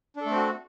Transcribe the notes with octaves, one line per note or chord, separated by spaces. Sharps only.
A3 C4 D4 F#4 A4